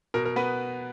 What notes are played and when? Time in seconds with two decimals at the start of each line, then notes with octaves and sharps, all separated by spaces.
0.14 B2 A#4
0.25 A#4
0.36 B3 B4